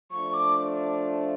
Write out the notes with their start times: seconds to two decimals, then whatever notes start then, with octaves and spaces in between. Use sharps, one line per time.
0.11 F3 A3 D4 C#6
0.34 D6